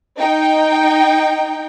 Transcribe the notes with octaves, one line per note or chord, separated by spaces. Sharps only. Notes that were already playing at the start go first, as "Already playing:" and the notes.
D#4 G5